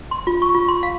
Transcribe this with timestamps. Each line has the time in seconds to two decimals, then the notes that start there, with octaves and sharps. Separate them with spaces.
0.11 C6
0.27 F4
0.42 C#6
0.55 F4
0.68 C6
0.83 F5